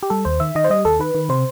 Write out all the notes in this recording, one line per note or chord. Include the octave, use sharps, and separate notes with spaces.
G4
G3 A4
D#2 C5
D#3 E5
D#3 D#5
C5
G3 D#5
D#2 A4
D#3 B4
D#3
C3 C5